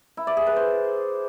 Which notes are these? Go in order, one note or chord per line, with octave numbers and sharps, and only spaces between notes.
E4
D5
G#4
B4
C5